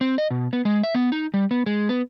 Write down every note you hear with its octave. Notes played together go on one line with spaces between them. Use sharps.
C4
D#5
B2
B3
G#3
E5
B3
D#4
G3
B3
G#3
B3